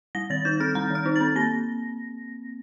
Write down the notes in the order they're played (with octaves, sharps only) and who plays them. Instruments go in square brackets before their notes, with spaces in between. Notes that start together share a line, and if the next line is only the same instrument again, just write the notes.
[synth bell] G3 A#6
D#3 A6
D#4 G6
C4 F6
G3 A#5
D#3 F6
D#4
C4 A6
A#3 A#6